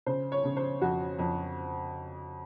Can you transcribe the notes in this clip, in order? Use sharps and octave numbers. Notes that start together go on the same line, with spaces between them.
C#3 C5
C#5
C#3
C5
F2 F#4
F2